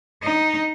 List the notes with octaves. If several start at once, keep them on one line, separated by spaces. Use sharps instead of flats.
D#4